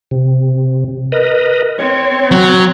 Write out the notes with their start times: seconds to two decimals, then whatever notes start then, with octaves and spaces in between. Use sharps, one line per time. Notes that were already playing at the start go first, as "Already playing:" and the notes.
0.11 C3
1.12 A#4 B4 D#5
1.79 C4 C#5
2.31 F#3 A#5